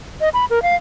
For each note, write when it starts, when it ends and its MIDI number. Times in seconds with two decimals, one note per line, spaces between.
0.21 0.29 75
0.34 0.45 83
0.50 0.62 70
0.63 0.75 77